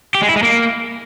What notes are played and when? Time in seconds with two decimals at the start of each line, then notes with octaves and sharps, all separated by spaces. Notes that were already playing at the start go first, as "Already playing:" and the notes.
0.15 G4
0.22 G#3
0.29 E4
0.36 G#3
0.43 A#3